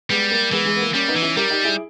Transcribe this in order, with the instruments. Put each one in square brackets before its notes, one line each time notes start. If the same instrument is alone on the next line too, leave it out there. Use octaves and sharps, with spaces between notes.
[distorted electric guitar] G3 [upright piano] G#3 B3
[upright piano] A#3
[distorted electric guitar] E3 [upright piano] G#3 B3
[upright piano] G#3
B3
A#3
[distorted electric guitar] G3 [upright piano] A#3 C#4
[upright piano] B3 D#4
[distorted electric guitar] E3
[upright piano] C#4 E4
[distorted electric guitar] G3 [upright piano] G4 A#4
[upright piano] D#4 G4
E4 G#4